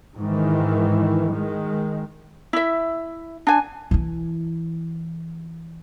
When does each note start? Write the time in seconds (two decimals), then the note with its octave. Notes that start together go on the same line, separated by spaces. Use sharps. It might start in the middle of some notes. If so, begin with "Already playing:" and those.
0.21 G#2 D#3 E3
1.33 D#3 G#3
2.53 E4 E5
3.47 D4 G#5
3.91 E3 E4